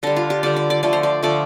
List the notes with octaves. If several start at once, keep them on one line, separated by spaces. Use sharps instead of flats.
D3 G3 D4
F4
G4
D3 G3 D5
D5
D5
D3 F3 A3 D5
C5
D5
D3 F3 A3 D5